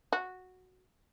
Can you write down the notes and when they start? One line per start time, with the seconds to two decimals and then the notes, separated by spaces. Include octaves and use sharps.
0.13 F#4